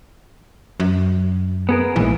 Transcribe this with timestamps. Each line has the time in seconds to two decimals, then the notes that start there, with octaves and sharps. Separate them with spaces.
0.80 F#2
1.69 B3 G#4 A#4
1.96 A#1 G#2 E3